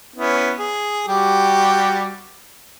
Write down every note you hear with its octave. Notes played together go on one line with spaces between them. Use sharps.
B3 C#4 E4
G#4
G3 F#4 G4